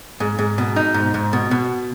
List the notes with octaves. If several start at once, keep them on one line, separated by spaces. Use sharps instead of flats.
G#2
G#2
B2
D#4
G#2
G#2
B2
B2